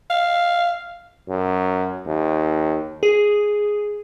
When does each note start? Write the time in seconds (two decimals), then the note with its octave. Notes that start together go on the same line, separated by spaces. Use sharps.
0.10 F5
1.29 F#2
2.06 D#2
3.03 G#4